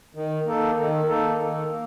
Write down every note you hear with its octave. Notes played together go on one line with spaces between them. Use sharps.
D#3
A#3 D#4 A4
D#3
A#3 D#4 A4
D#3
A#3